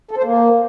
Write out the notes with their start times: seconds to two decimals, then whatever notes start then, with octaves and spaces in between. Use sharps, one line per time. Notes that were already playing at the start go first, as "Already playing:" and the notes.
0.11 A4
0.18 C5
0.24 A#3